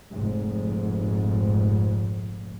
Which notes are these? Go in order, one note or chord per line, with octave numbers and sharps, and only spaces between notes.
F1 A#1 G#2